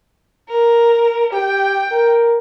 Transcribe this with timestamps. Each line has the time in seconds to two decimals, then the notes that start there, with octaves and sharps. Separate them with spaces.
0.49 A#4
1.32 G4 G5
1.92 A#4